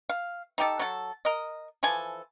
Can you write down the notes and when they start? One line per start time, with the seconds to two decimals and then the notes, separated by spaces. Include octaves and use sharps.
0.09 F5
0.58 D#4 G4 A4
0.79 F#3 A4
1.25 A#4 D#5
1.83 E3 F3 A4 G#5